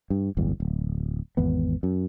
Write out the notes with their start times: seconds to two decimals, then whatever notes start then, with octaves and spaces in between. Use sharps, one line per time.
0.10 G2
0.37 D1 G1 E2
0.60 D1
1.37 G#1 E2 B3
1.83 F#2